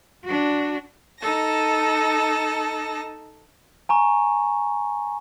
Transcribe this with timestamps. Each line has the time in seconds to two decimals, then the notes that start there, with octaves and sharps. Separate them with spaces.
0.25 D4 F#4
1.20 D#4 A4 A5 A#6
3.89 G#5 A#5 C#6